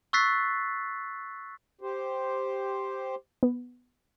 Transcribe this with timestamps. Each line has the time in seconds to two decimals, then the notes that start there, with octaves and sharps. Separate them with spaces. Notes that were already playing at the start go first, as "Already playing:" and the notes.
0.13 C#6 E6 F#6 A6 B6 C7
1.81 G4 C5
3.43 B3